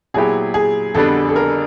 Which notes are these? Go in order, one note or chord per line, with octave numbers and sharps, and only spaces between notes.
A#2 F#3 B3 E4 G4 G#4
G#4
F2 D3 G3 B3 D4 A4
A4
A#4